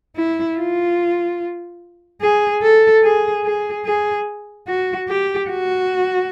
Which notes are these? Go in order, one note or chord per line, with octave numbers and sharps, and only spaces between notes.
E4
F4
G#4
A4
G#4
G#4
G#4
F#4
G4
F#4